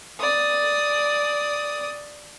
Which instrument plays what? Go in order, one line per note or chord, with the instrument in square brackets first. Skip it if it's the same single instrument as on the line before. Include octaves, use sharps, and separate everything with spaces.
[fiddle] D5 D#6